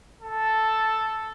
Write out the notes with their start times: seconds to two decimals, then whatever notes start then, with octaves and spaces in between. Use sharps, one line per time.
0.21 A4